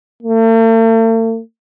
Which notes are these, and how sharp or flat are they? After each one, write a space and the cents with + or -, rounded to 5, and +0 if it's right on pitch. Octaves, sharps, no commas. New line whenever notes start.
A3 +45